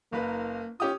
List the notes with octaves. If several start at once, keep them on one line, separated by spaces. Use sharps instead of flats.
F#1 A#3 B4
C#4 F4 G4 D#6